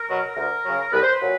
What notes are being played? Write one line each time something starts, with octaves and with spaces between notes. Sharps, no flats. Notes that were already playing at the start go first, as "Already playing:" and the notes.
Already playing: A#4
B2 F#3
D2 A#4
C#3 F#3
C2 B4
C5
B4
A#2 F#3